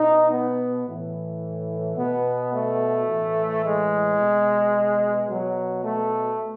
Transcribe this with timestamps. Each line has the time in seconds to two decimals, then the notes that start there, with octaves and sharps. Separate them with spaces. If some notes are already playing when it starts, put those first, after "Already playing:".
Already playing: B2 D#4
0.31 B3
0.86 A2 E3
1.97 B2 B3
2.52 A3
3.08 A2 E3
3.63 G#3
4.18 B2
5.29 B2 F#3
5.85 A3